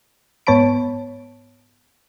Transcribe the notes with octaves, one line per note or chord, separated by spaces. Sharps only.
G#2 B3 C#5 A5 B5 D7